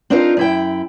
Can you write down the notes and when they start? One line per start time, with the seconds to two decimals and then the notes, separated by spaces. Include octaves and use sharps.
0.10 C4 D4 D#4 F4 A#4 C5
0.37 F#2 E4 G5